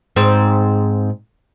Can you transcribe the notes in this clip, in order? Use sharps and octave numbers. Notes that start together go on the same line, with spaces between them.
G#2 C4